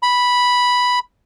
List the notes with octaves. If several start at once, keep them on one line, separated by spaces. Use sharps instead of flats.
B5